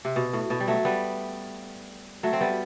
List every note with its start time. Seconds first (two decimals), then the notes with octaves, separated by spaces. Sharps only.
0.05 C3
0.16 B2
0.33 A2
0.50 B2
0.60 G3
0.68 F#3 A3
0.85 G3 B3
2.23 F#3 A3
2.33 C4
2.41 G3 B3